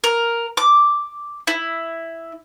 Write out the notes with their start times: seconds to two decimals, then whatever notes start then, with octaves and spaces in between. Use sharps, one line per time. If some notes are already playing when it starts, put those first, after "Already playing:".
0.04 A#4
0.57 D6
1.47 E4